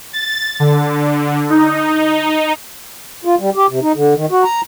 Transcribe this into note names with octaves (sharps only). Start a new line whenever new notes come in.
A6
D3
D#4
F4
G3
G4
C3
D#4
D3
D#3
F#4
A#5